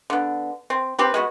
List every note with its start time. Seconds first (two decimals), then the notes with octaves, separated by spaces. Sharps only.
0.10 D3 B3
0.70 C4
0.99 C4 G4 B4
1.14 G#3 B3 F#4